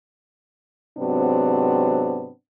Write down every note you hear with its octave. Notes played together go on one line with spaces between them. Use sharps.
G#2 C3 F#3 B3 C4 D4